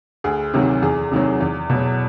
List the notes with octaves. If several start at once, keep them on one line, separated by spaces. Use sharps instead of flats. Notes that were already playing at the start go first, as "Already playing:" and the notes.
D2 G#4
C3 D#3 F#3
E2 G#4
C3 D#3 F#3
E2
B2 F#3